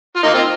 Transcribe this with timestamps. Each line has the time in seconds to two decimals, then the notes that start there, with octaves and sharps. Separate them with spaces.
0.16 F4
0.23 A#3 D#4
0.34 C4 F4